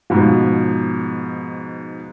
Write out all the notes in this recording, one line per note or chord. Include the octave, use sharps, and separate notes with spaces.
G#2 B2 F3